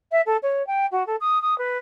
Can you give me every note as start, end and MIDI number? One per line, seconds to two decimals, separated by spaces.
0.11 0.21 76
0.26 0.37 69
0.42 0.65 73
0.67 0.86 79
0.91 1.06 66
1.06 1.16 69
1.20 1.41 87
1.42 1.57 87
1.58 1.77 71